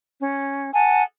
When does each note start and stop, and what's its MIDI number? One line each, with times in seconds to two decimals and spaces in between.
0.21 0.71 61
0.73 1.03 78
0.73 1.03 80
0.73 1.03 81